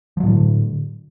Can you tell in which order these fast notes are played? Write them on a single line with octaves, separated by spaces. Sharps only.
F3 F#3 A2 D3